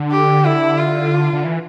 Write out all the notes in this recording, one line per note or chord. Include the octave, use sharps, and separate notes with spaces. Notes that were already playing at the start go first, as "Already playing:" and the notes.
Already playing: D3
G4
E4
F4
D3
E3